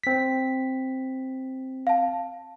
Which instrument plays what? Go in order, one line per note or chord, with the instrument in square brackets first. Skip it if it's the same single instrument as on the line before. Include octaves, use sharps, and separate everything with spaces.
[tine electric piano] C4 B6
[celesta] F5 A5